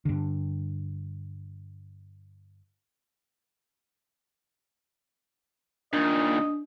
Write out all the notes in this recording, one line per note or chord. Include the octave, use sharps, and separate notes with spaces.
G2 D3
A#2 D#3 D4 D#5